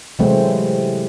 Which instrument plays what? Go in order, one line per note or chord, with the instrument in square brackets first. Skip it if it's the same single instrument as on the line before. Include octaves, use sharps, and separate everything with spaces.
[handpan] C3 E3 F#3 G#3 A3 C4